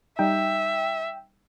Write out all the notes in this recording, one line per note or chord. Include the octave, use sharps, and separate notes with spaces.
G3 D#4 E5 G5